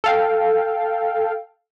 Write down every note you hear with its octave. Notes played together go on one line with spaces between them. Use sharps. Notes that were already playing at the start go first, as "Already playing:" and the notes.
A4 F5 G5